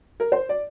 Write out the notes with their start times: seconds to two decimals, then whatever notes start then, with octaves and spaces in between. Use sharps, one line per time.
0.20 A#4
0.32 C5
0.49 D5